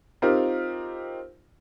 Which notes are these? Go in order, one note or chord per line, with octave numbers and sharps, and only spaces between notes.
C4 D#4 F4 G4 A#4